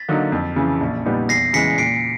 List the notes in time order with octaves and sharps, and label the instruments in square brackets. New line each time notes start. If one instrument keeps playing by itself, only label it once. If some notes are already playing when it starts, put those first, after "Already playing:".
Already playing: [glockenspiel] A6 B6
[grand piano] D3 F#3 A#3 D#4
F2
C#3 E3
A#1
A#2 G3 B3 D#4
[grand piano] E2 [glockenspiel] A#6 C7
[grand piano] C#3 E3 G#3 [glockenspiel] B6 C#7
[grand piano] A#2 [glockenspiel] C7 D7